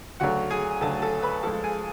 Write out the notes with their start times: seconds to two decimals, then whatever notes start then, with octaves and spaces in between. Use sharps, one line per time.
0.20 D2 C#3 F#3 A3 F#4 F#5
0.50 G#4 G#5
0.81 D2 C#3 F#3 A3 A4 A5
1.02 A4 A5
1.22 B4 B5
1.43 F2 F3 G#3 A4 A5
1.64 G#4 G#5